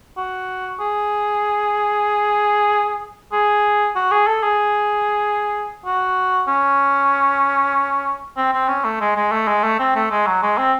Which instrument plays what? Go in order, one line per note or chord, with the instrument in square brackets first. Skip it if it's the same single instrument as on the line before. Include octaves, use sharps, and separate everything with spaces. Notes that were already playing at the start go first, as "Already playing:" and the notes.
[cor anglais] F#4
G#4
G#4
F#4
G#4
A4
G#4
F#4
C#4
C4
C4
C#4
A3
G#3
G#3
A3
G#3
A3
C4
A3
G#3
F#3
G#3
C4